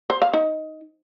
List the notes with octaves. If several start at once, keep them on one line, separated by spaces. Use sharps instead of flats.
C5
F5
D#4